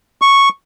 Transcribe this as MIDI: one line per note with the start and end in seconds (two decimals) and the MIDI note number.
0.22 0.49 85